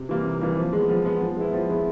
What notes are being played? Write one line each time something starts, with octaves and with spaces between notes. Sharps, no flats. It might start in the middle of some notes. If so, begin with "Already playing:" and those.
Already playing: C3
E3 G3 A#3
C3
E3 G3 A#3
F3
G#3 B3
F3
G#3 B3
F3
G#3 B3 E4
F3
G#3 B3 E4